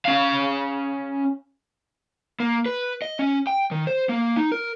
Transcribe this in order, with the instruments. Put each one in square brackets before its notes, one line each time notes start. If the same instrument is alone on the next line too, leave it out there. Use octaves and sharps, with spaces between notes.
[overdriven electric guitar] C#4 F5
[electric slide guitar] A#3
B4
D#5
C#4
G5
D#3
C5
A#3
D#4
A#4